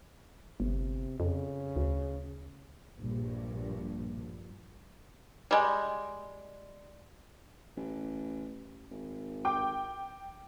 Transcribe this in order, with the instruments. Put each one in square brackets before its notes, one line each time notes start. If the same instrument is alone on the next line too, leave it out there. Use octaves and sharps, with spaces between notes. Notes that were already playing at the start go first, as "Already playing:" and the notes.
[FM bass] G1 [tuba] C3
[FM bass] F2 [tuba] C#3
[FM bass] D2
[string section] A#1 G2
[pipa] G3 G#3
[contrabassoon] A1
G#1
[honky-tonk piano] G5 D6